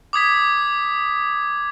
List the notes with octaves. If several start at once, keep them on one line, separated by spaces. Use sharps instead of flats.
D6 D#6 G#6 B6